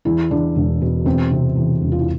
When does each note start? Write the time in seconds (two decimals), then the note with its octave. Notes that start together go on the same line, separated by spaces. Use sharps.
0.05 E2 E4
0.31 E2 D4
0.56 E1
0.82 B2
1.05 E2 C4
1.31 C3
1.56 E2
1.82 E1
1.92 F4
1.99 E4